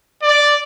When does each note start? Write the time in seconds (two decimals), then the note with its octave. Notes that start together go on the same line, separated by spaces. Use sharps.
0.22 D5